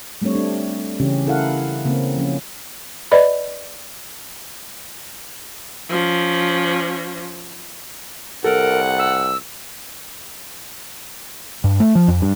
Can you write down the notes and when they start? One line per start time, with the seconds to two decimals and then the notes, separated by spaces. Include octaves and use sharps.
0.22 G3 A3 C4 D4 C#5
0.35 D4
1.00 C#3 E3 C#4 G4
1.27 E4 A4 A#4 F5 F#5
1.85 C#3 A#3 C4 C#4
2.17 F3 C#4
3.11 B4 D5 D#5 B5
5.90 F3 C#4
8.44 C2 A4 A#4 F#5
8.99 E6
11.64 G2
11.80 A3
11.95 F3
12.08 F2
12.22 G2